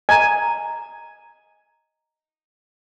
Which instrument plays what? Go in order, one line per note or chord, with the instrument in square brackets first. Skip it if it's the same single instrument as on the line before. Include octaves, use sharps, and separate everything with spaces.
[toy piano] D#5 A#5 [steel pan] G#5